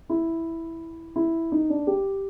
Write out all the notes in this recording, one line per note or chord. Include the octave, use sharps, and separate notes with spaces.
E4
E4
D#4
D4
G4